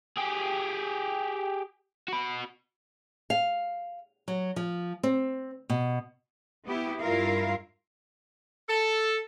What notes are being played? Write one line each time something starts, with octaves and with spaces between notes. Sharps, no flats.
G4 G#4
F#4 B5
F5
F#3
F3
C4
B2
B3 E4 G4
G2 E4 F4 A#4 F5
A4